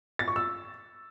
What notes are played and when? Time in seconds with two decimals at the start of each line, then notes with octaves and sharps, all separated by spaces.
0.19 A6
0.28 C#6
0.36 E6